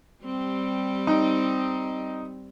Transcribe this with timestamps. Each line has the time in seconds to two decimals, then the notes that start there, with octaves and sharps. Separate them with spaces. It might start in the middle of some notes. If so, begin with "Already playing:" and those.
0.24 G3 C4 G4
1.07 D#4